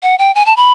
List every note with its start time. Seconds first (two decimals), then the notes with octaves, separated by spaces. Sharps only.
0.03 F#5
0.19 G5
0.35 G#5
0.46 A5
0.57 B5